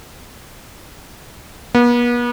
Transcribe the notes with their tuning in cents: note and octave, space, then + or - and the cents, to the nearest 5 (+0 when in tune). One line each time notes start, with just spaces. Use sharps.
B3 -40